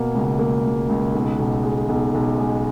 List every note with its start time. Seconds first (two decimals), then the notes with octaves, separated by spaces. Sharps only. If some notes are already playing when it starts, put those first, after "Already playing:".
Already playing: B2 A#3
0.15 C#2
0.39 A#3
0.64 C#2
0.89 C#2
1.14 B1
1.39 B1
1.63 G#3
1.89 B1
2.14 B1
2.38 G#3